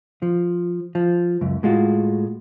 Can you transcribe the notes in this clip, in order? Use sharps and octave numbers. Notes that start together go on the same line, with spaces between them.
F3
F3
C#2 F#2
A2 G#3 F4 F#4